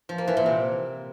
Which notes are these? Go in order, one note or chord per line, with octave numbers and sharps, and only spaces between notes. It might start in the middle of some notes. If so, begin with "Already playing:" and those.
F3
A#3
E3
A#2
C3